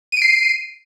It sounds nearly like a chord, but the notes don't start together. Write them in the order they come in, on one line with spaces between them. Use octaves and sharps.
D#7 D7 C7